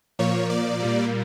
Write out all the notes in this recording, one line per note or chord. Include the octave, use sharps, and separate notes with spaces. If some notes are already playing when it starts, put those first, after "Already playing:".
A#2 F3 A#3 C#5
D5
A#2 G3 A#3